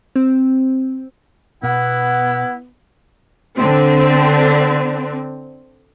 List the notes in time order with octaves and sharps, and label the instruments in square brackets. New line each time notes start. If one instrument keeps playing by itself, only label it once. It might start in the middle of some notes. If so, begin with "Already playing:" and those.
[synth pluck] C4
[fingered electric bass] B2 [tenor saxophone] B3 [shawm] E4 [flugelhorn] F#5
[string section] D3 C4